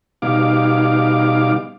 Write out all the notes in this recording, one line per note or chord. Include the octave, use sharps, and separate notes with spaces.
B2 G3 D#4 F5 D6